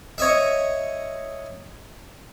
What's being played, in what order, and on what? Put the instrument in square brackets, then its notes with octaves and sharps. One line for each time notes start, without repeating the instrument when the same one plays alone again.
[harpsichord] C#5 D#5 E5